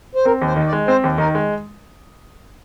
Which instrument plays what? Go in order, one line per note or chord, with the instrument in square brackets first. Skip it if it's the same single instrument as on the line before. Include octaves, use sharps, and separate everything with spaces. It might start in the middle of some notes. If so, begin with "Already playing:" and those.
[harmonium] C5
[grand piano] C4 [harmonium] A#4
[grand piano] D#2
[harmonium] C5
[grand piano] D#3
[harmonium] D5
[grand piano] G#3
[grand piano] C4 [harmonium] C5
[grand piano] D#2
[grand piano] D#3 [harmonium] A#4
[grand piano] G#3